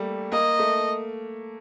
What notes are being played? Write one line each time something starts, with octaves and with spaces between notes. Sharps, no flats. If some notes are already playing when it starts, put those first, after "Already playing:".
Already playing: G3 A3 A#3
A#3 D#5
A3